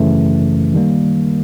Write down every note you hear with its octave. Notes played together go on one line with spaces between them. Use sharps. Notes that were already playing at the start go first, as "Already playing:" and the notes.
Already playing: G#1 F#2 C#3 E3 A3
D#3 G3 A#3